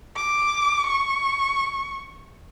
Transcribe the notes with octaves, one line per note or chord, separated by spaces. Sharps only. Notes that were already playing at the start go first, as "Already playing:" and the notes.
D6
C#6